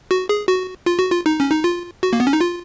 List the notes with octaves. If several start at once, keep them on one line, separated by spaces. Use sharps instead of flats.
F#4
G#4
F#4
F4
F#4
F4
D#4
C#4
D#4
F4
F#4
A#3
B3
C#4
D#4
F4